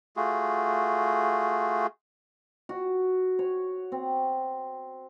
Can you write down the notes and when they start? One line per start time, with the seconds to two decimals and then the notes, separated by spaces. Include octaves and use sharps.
0.17 A3 F4 F#4 G#4
2.69 F#4
3.39 C#5
3.92 C4